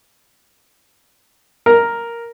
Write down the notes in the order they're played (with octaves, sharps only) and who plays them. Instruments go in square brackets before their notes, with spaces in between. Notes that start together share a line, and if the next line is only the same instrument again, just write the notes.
[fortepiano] A#4